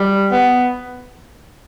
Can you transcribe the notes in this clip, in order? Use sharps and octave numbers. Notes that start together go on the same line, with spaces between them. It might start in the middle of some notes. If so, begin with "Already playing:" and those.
Already playing: G3
B3